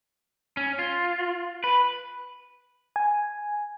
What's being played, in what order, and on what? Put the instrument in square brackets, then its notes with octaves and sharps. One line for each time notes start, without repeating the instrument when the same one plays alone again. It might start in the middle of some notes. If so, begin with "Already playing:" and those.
[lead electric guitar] C#4
F4
B4
[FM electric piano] G#5